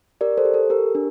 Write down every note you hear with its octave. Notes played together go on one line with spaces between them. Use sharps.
G4 A#4 D5
A4 C5
G4
A4
G4 A#4
D4